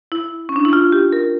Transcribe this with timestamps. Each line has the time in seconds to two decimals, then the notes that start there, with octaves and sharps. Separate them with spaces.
0.12 E4
0.49 C#4
0.56 D4
0.65 E4
0.73 F4
0.92 G4
1.13 A#4